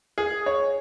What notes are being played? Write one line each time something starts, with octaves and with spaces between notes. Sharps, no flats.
G#4
C#5